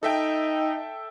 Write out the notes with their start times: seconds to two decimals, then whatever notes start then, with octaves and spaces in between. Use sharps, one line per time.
0.03 D#4 A4 E5 G5